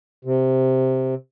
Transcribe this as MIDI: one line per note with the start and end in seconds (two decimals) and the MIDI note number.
0.25 1.15 48